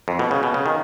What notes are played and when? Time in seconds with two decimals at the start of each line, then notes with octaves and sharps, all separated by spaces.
0.08 F2
0.19 B2
0.31 C#3
0.43 B2
0.54 C#3
0.66 D#3